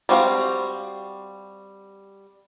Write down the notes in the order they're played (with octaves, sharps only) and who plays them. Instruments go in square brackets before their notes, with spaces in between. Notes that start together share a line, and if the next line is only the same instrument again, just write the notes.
[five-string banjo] G3 C4 F#4 B4 F5